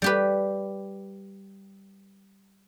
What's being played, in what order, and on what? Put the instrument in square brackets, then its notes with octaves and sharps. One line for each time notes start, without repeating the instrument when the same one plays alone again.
[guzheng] G3 G4 B4